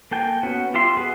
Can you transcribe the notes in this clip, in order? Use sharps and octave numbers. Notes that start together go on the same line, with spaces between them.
A#3 A4 G5 G#5
B3 C#4 F#4
F4 G4 E5 C6
B3 F#4 G#4 B4